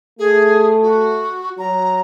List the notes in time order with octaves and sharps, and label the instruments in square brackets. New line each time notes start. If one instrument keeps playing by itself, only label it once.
[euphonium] A3 [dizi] G#4
[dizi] F#4
[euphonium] F#3 [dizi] A#5